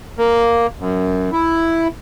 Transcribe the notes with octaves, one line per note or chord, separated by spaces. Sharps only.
A#3
F#2
E4